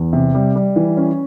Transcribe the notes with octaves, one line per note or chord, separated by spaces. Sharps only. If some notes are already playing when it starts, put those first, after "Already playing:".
Already playing: E2
C3
G3
G3
E3
C#4